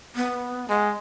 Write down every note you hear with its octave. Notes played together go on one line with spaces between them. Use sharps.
B3
G#3 F#5